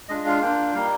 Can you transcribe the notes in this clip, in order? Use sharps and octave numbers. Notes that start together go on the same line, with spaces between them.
G#3 D4 F4 D#5
F5
A#3 D4 F4 G5
G3 A#3 D#4 F5